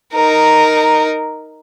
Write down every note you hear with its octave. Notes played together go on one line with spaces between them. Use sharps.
D#4 A#4